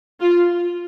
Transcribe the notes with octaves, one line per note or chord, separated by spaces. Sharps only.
F4